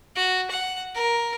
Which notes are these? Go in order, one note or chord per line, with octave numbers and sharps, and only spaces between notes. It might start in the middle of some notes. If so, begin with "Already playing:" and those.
F#4
F#5
A#4